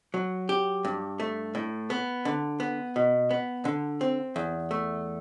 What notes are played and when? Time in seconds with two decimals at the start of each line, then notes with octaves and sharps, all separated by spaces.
0.14 F#3
0.49 G4
0.85 G2
1.20 A3
1.55 A2
1.90 B3
2.25 D3
2.60 B3
2.96 B2
3.31 B3
3.65 D3
4.01 C4
4.36 E2
4.71 A3